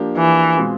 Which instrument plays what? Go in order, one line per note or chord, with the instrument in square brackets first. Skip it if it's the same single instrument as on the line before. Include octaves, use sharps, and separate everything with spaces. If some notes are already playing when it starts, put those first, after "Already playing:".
Already playing: [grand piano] F3 A#3 D4 G4
[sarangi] E3
[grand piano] B2 G#3 C4 F4 G#4